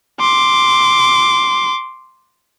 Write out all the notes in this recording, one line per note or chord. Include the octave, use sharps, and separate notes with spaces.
C6 D6